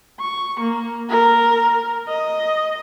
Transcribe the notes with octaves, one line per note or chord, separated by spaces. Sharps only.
C#6
A#3
A#4
D#5